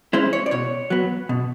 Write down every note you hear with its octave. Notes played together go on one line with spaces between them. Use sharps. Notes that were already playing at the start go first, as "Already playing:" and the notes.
G#3 C#4 E4 C5
C#5
D5
B2 C#5
F#3 B3
B2